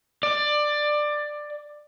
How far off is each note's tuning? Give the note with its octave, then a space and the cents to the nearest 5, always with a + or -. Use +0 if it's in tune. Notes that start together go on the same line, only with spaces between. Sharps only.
D5 +15